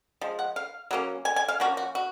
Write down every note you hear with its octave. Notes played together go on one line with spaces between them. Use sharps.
F3 G#3
F#5
F5
F#3 A#3 C#4
G#5
G#5
F5
F3 A#3 C#4 F#4
F#4
F#4